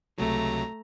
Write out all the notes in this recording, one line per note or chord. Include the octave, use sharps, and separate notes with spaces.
C#2 C3 F#3 A3 A#5